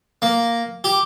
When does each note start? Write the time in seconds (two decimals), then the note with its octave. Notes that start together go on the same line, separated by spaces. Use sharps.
0.22 A#3
0.84 G4